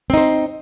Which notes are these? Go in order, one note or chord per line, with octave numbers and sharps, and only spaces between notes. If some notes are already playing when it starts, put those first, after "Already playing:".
C4 D#4 C5